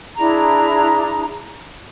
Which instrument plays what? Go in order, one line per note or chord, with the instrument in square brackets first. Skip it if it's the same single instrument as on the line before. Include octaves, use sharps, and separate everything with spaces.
[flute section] D4 E4 G#4 A#5